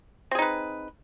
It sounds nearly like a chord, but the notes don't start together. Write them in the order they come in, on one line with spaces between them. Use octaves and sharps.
C4 G#4 D#4 B4